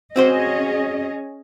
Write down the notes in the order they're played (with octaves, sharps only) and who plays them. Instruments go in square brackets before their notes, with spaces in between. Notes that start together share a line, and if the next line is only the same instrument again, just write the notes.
[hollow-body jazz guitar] C4 F#4 C5 [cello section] C#4 G#4 D#5